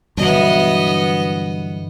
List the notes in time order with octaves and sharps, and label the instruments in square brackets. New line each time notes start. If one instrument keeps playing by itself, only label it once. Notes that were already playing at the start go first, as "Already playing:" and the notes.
[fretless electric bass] G2 B2 F#3 [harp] D3 E3 [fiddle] B3 D#5